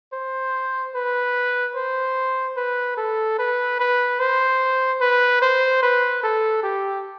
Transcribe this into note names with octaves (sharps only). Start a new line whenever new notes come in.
C5
B4
C5
B4
A4
B4
B4
C5
B4
C5
B4
A4
G4